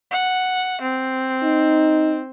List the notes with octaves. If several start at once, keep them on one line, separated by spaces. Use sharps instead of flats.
F#5
C4
D#4